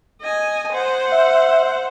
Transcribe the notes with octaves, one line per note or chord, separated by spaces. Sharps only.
D#5 G#5
C5 F#5
E5